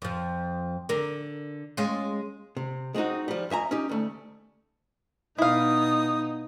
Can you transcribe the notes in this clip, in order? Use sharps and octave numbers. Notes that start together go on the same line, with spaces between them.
F2 F3
D3 A#4
G#3 C#4 F4
C3
G#3 C4 C#4 D#4 F#4
F3 G3
F2 E5 G#5 A#5
C#4 D#4 G4
D2 A3
B2 D#4 E4 F5 D#6